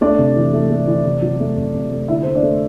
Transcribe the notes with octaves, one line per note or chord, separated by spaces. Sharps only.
A3 D4 D5
C3
E3
A3
A3
E3
C3
F#3
A3
C3
C3
A3
D3 E4 E5
A3 C5
D4 D5
A3